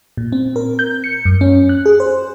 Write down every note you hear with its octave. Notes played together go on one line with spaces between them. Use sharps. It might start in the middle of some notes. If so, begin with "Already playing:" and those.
A#2
C4
A#4
G6
C#7
F#2
C#4
F#6
G#4
C5